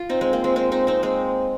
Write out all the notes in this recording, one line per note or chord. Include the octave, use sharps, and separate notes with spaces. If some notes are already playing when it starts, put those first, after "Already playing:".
Already playing: F4
C4 D#4
G#3 C4
A#3
G#3 C4
G#3 C4
C4 D#4
C4 D#4
G#3 C4